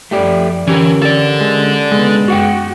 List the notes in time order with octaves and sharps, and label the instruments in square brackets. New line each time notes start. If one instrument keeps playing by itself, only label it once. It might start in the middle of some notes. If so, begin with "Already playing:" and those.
[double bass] F#2 F3 [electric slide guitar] A3 G4 D5
[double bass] D3 [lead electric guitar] E3 [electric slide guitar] C#4 G4 A#4
[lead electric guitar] A4 D5
[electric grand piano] G#3
[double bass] C#3 B3 [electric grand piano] G#3
[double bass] F#2 [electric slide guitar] F#4 F#5 G5